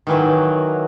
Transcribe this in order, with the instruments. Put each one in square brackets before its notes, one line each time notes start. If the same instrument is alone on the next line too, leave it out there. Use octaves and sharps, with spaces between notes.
[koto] D#3 E3 F#3